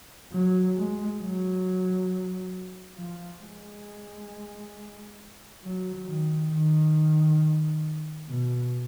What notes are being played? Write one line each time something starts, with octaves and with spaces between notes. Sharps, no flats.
F#3
G#3
F#3
F3
G#3
F#3
D#3
D#3
B2